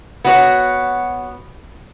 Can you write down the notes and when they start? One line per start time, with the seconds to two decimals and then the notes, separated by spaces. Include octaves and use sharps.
0.25 B3 F#4 C#5